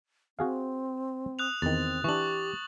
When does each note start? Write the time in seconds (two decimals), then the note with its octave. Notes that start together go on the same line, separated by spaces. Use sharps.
0.39 C4 F#4 G#4 F5
1.39 D#6 F#6 F7
1.62 E2 D#3 C4 A6
2.04 E3 D4 G4 C#6 F#7